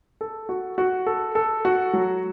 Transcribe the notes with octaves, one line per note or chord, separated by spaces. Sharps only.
A4
F#4
F#4
A4
A4
F#4
F#3